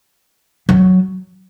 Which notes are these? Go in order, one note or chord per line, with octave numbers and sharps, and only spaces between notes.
F#3